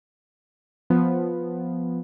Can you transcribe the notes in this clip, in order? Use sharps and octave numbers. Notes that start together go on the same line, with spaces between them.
F3 B3